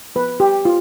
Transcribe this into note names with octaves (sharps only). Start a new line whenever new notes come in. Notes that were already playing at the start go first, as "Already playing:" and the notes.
F3 B3 B4
G4
F4